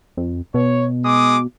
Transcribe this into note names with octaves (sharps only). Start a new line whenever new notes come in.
F2
B2 C#5
G#3 D6 D#6